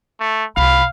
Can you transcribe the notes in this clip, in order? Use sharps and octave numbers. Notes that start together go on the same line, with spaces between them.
A3
C2 F5 B5